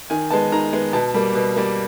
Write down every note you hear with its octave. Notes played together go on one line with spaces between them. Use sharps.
D#3 G#5
G#3 B3 A5
D#3 A#5
G#3 B3
B2 A5
G3 A#3
B2
G3 A#3